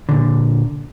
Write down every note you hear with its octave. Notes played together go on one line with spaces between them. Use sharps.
A#2 D3